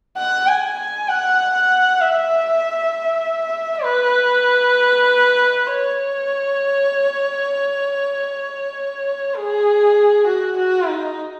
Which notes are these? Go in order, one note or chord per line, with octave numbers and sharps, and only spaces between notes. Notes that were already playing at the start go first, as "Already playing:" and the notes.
F#5
G#5
G#5
F#5
F#5
E5
B4
C#5
G#4
F#4
F#4
D#4